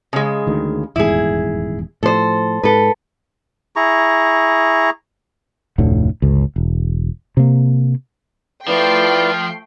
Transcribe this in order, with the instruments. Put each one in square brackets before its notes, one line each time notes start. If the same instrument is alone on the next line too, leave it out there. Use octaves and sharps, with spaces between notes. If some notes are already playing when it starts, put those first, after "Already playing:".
[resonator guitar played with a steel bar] C#3 G#3
[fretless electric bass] D2 D#3
[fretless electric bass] D#1 E2 G#2 [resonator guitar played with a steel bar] E4 G#4
[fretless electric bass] A2 F3 [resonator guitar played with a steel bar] A4 C5
[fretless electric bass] G#2 [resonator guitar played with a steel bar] A4 B4
[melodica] E4 G#4 A#5 C#6
[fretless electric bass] F1 D2 A2 D3
G1 C#2
E1
C3 A#3
[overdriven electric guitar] F3 [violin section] A3 G5 C7 [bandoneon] E4 F4 D5 [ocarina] B4